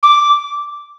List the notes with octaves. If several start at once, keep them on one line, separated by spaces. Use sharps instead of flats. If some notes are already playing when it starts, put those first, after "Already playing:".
D6